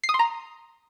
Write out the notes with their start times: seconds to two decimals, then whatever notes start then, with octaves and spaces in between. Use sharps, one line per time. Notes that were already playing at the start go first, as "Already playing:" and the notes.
0.04 C7
0.09 D#6
0.14 C6
0.19 A#5